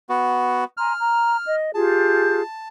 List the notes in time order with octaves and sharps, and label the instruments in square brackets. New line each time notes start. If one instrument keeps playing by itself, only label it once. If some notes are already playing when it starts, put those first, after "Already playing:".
[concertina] B3 F#4
[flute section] G#5 A#5 C6 [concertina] F6
[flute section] A#5
D#5
[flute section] F4 G4 G#4 [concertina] A5